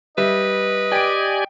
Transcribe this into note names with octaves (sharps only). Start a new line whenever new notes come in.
G3 B4 D#5 E5
G4 D5 G5 G#5 D7